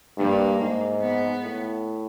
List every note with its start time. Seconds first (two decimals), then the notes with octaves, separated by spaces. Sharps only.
0.18 G2 A#3
0.60 G#2
1.01 B3
1.43 A2